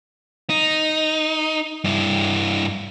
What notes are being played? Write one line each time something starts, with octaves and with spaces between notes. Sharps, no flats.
D#4
G2 E4